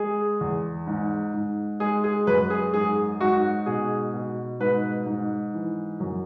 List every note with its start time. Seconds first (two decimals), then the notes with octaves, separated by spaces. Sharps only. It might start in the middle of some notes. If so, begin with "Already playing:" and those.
Already playing: G#3 G#4
0.41 E2
0.87 G#2
1.34 G#2
1.80 G#3 G#4
2.04 G#4
2.27 F#2 B4
2.50 G#4
2.73 G#2 G#4
3.20 G#2 F#4
3.66 B2 G#4
4.14 B2
4.60 G#2 B4
5.06 G#2
5.54 E3
6.00 F#2